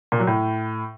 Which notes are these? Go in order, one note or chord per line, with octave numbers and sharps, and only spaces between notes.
A#2
F#3
A2